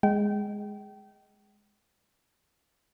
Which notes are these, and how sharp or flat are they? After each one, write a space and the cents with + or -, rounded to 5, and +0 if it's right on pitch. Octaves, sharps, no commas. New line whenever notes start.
G#3 +0 G5 -25